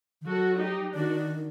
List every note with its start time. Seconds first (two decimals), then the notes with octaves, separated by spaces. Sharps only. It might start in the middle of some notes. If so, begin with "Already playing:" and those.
0.21 D#3
0.26 F#3 F#4 A4
0.61 D#4 G4
0.94 D#3 D4 F#4